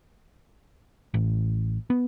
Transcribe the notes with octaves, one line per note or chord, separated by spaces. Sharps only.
A1
B3